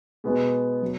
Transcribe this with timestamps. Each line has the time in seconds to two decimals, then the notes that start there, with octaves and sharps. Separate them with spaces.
0.24 B2 G#3 B3 G#4
0.82 F#3